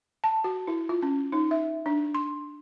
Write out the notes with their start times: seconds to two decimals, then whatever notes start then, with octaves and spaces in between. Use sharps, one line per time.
0.24 A5
0.44 F#4
0.67 E4
0.89 F4
1.02 C#4
1.32 D#4
1.51 E5
1.86 D4
2.15 C6